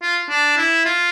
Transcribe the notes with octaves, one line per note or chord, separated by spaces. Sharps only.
F4
D4
E4
F4